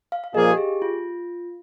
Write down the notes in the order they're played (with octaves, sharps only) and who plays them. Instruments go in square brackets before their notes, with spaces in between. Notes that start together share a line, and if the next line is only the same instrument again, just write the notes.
[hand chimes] F5
F5
[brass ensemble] A#2 F3 A#3 F4 G#4 [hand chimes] D#5
[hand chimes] G4
G#4
F4